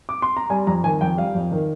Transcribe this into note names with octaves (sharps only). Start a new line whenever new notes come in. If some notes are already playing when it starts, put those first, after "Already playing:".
D6
C6
A#5
G3 G#5
F2 A#5
D#3 G#5
F2 G5
G3 F5
F2
D#3